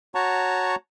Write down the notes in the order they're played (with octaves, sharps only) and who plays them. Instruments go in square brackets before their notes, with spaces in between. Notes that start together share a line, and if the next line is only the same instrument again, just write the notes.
[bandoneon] F#4 C#5 F#5 A5 A#5 C#6